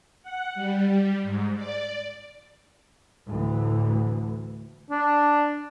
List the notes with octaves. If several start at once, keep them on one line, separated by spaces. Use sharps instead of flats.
F#5
G3
G3
G#2
D5
D2 A2 E3
D4